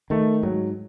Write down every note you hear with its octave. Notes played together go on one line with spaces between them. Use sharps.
D#3 A3
G#2 F#3